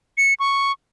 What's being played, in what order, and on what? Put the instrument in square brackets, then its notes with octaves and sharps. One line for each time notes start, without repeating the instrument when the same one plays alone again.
[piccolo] C#7
C#6